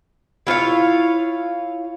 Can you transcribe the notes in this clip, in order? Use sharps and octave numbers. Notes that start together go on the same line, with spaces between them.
E4 F4 C#5 F5